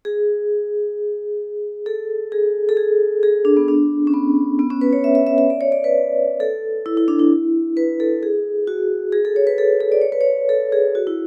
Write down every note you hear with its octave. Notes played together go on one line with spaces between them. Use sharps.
G#4
A4
G#4
A4
G#4
G#4
D4
B3
D4
C#4
B3
B3
C#4
B4
C#5
E5
E5
E5
E5
D5
C#5
D5
B4
A4
E4
E4
D4
E4
B4
A4
G#4
F#4
G#4
A4
C#5
B4
A4
A4
D5
C#5
B4
C#5
A4
G#4
F#4
E4